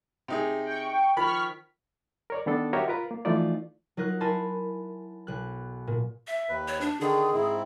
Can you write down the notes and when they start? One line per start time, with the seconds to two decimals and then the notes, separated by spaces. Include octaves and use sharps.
0.28 C3 D#4 G#4
0.65 G5 C#6
1.16 D#3 F3 B5 C#6 F6 B6
2.30 A#4 C#5 D5
2.46 D#3 B3 D4 A4
2.73 F#4 G4 A#4 C#5 D#5 E5
2.88 F4 A#4 B4 A#5
3.11 A#3
3.25 E3 F3 A3 D#4 F4 D5
3.97 F#3 D#4 F4 A#4 F#6
4.20 E4 A#4 G#5 A5 B5 C6
5.27 B1 F#6
5.87 A#2
6.27 E5
6.49 D#2 B4
6.68 C#5
6.81 D4
7.01 D3 D#3 G#4
7.34 G#2 C4 E4